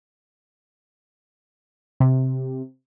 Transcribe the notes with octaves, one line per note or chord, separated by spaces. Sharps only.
C3